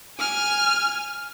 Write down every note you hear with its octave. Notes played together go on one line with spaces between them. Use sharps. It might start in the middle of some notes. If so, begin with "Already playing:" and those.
G#5 F6